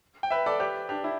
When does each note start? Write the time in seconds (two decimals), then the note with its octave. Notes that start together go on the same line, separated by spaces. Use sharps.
0.23 G5
0.31 B4 E5
0.46 A4 D5
0.60 G4 B4
0.89 D4 G4
1.04 E4